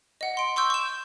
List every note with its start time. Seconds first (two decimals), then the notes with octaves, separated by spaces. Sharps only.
0.21 D#5 F#5
0.37 C6 D7
0.56 C6 C#6 E6 G6
0.70 C#6 E7